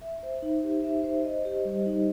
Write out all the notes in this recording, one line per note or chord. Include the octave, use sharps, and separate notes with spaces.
E5
C5
D#4
G4
E5
C5
D#5
G4
G3
D#4